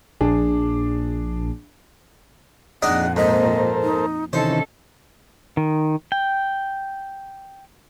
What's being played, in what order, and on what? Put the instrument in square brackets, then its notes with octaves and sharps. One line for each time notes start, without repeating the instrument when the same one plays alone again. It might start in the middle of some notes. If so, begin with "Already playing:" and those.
[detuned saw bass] A#1 [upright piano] D4 G#4
[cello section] F2 A#2 [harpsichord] D4 D#4 D#5 [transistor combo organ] G#4 [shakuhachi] F#5
[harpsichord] G#2 [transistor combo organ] A4 A#4 C5 [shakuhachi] D#5
[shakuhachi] D#4
[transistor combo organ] C3 D#3 E3 [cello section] C#4 A4 [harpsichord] C5 [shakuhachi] D#5
[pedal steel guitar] D#3
G5